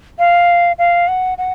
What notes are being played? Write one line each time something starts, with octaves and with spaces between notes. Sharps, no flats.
F5
F5
F#5
F#5